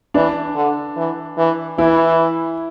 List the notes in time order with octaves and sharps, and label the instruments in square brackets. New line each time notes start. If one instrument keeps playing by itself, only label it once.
[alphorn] E3 [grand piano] D4
[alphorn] D3
E3
E3
[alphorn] E3 [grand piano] E4